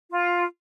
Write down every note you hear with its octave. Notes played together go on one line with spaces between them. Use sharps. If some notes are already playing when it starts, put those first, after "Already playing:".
F4